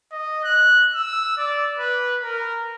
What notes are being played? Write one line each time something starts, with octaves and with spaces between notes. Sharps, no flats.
D#5
F#6
E6
D5
B4
A#4